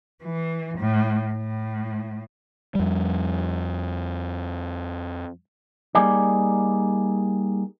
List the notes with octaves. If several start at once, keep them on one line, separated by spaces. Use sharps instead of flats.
E3
A2
A2
F2 G3
G3 A#3 D#4 G#4 D5